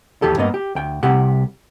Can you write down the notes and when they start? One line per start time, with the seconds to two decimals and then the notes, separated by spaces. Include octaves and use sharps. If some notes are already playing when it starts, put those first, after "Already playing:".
0.22 D#2 E3 G4 A4
0.38 G2 A#3 B3 D#5
0.54 G4
0.75 D2 G5
1.03 C2 C3 G4 F#5